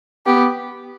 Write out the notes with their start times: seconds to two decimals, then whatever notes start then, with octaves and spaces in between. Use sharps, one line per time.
0.26 B3 G4